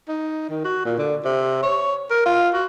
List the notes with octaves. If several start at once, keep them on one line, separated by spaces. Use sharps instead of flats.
D#4
D#3
F#4
A#2
D3
C3
C#5
A#4
F4
F#4